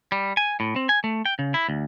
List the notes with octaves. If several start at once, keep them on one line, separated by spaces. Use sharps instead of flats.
G3
G#5
A2
C4
G#5
A3
G5
C#3
E4
D2